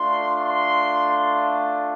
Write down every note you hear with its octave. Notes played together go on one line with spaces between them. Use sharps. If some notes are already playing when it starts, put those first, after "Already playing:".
Already playing: A3 D4 F4 C6
C6